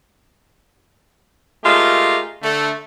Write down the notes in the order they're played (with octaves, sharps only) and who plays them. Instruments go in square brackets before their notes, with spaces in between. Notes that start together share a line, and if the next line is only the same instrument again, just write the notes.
[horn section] G#3 A3 F4 G4 A#4
D3 A3